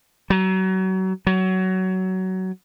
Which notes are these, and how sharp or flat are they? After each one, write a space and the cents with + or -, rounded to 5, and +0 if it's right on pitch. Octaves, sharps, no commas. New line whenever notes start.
F#3 +30
F#3 +20